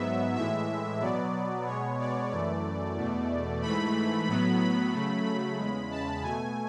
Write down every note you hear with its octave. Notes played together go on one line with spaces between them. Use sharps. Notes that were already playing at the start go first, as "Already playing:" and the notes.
Already playing: G#2 F#3 B3 E5
A2 E3 G#3 E5
B2 F#3 B3 D5
B2 G#3 B3 C#5
D5
F#2 E3 A3 D5
E2 B2 A3
G#2 E3 A3 B5
A2 F#3 B3 B5
B5
C#3 F#3 A3
B5
E2 C#3 G#3
A5
B2 A3 G#5